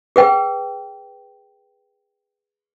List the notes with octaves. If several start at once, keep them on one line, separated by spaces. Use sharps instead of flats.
G#4 B4 G5